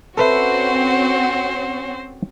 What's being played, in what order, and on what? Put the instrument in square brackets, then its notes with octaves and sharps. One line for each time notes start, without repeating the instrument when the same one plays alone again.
[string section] C4 C#4 F#4 [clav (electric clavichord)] A4 B4 E5 [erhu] C5